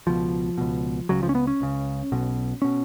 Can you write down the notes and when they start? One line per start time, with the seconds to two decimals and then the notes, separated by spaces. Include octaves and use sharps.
0.07 C#2 B2 F3
0.58 C#2 B2
1.09 C#2 C#3 F#3
1.23 F3
1.29 C#4
1.35 B3
1.47 C#4
1.61 C#2 C#3
2.12 B1 B2
2.62 B2 C#4